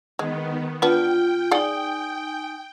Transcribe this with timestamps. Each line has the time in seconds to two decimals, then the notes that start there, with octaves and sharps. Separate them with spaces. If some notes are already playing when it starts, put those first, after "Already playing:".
0.19 D#3 G#3 B3
0.82 B3 D4 F4 G5
1.51 D#4 G#4 D5 F#5 G#5